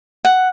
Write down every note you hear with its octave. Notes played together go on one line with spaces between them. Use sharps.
F#5